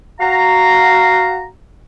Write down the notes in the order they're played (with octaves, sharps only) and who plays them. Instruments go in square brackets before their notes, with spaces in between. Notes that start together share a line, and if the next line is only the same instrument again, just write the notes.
[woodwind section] F#4 F5 A#5